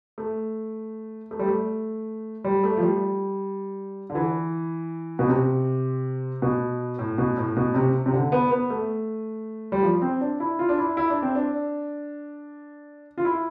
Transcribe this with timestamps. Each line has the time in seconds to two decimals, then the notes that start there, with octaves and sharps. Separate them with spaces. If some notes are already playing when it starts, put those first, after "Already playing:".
0.18 A3
1.31 A3
1.39 G3
1.46 A3
2.44 G3
2.64 A3
2.77 F3
2.82 G3
4.10 D3
4.15 E3
5.19 B2
5.28 C3
6.42 B2
6.99 A2
7.18 B2
7.37 A2
7.56 B2
7.74 C3
8.06 C3
8.13 D3
8.32 B3
8.51 B3
8.70 A3
9.72 G3
9.83 F3
10.02 C4
10.21 D4
10.40 E4
10.59 F4
10.69 D4
10.78 E4
10.97 E4
11.10 D4
11.22 C4
11.35 D4
13.18 F4
13.25 E4